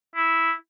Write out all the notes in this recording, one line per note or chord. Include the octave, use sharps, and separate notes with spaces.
E4